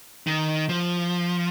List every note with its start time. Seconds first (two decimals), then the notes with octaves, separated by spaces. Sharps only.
0.27 D#3
0.69 F3